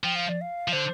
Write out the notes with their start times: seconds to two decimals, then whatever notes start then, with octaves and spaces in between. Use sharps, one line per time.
0.04 F3 G5
0.16 F5
0.29 D5
0.41 F5
0.68 F3
0.73 D3 C5